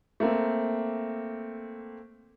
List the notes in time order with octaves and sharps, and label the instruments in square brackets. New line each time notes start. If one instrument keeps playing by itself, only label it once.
[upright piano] A3 A#3 C4